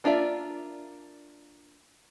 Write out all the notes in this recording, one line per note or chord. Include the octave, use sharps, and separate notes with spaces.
A#3 D4 F4 D5 E5